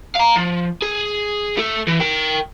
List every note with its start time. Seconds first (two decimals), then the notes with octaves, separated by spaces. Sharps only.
0.15 F5 A#5
0.36 F3
0.82 G#4
1.57 A3 A4
1.88 E3
2.01 A#4 G5